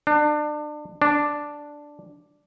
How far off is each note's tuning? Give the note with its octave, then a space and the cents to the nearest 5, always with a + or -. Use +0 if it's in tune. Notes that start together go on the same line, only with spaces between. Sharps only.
D4 +30
D4 +0